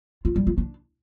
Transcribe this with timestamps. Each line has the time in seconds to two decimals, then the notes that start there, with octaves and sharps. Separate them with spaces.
0.25 F4
0.36 G3
0.47 F4
0.58 D4